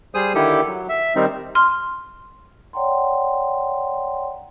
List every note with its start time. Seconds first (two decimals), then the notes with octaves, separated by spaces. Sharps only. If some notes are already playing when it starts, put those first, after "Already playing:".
0.14 G3 G#4 C5 D#6
0.35 D3 D#3 E4 G4 A4
0.67 F#3
0.89 E5
1.16 D#3 G3 C4 D#4
1.55 C6 F6
2.73 C#5 D5 F#5 G5 A#5 C6